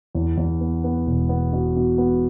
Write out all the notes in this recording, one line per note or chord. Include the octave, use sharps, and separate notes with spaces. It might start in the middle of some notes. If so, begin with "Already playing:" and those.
E2
E2
B3
B3
E1
B3
B2
B2
B3